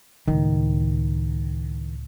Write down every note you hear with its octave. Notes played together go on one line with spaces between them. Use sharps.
C#2 A2 D#3